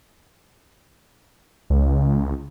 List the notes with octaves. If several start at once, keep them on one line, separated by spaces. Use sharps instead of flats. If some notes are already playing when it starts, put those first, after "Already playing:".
C#2